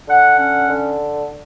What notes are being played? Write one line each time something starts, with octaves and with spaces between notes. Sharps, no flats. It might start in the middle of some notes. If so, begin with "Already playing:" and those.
D3 F#5
C#4 F#5
D3